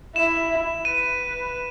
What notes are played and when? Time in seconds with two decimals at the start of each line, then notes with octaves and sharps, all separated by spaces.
0.16 E4 E7
0.85 B4 D#7